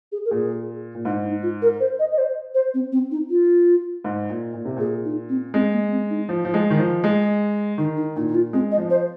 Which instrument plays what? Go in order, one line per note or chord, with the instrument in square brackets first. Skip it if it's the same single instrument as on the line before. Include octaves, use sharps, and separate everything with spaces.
[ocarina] G#4
A#4
[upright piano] A#2 [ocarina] G#4
[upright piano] A#2
[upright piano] G#2 [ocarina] D#4
[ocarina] D#4
F4
A#4
C5
D#5
D#5
C5
C5
C4
C4
D#4
F4
[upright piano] G#2
A#2
A#2
C3
[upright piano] A#2 [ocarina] G#4
[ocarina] D#4
C4
[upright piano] G#3 [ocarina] C4
[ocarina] A#3
C4
D#4
[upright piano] F3
F3
G#3
D#3
F3
G#3
[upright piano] D#3 [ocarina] D#4
[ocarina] D#4
[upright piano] A#2 [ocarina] D#4
[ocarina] D#4
F4
[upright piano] G#3 [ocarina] C4
[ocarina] D#5
[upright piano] F3
[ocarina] C5